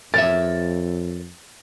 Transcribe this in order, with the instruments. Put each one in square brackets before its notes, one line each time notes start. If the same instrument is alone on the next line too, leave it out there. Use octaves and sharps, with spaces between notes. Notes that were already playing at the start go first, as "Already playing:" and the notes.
[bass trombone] F2 [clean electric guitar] A#4 C#5 E5 [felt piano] A6